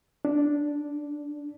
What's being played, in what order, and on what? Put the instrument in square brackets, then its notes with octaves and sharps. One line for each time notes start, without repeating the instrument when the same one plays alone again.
[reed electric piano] D4